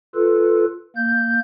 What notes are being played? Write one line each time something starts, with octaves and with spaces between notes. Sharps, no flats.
F4 A4 B4
A#3 G6